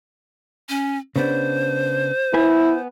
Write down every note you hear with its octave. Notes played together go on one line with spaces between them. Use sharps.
C#4
C#3 B3 D4 C5
B3 E4 B4 G#5